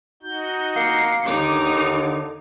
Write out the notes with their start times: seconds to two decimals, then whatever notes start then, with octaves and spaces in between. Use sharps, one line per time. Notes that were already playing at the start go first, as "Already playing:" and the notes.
0.23 D#4 F#4 G6
0.76 A#3 C7 C#7
1.26 D#2 D3 D#4 D6